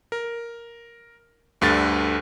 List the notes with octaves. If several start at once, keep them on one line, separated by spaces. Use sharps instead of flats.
A#4
D2 G2 D3 A6